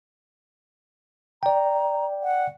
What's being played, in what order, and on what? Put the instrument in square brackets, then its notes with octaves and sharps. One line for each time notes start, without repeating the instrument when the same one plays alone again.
[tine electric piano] D5 G5 [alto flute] A#5
[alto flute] F#5